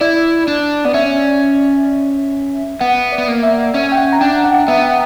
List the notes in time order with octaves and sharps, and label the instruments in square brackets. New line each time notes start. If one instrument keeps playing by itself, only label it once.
[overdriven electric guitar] E4 [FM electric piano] D5
[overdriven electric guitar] D4
[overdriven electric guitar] B3 [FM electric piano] D5
[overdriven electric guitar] C#4 [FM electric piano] E5
[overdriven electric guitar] B3 [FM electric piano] F#5
[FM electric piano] D5
[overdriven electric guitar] B3
A#3
[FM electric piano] E5
[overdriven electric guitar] C#4 [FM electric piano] E5
[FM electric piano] G5
F#5
A#5
[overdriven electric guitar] D4 [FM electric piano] G5
[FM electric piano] F#5
[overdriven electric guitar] B3 [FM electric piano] E5